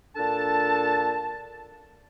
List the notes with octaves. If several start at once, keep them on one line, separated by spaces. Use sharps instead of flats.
A#2 D4 A4 A5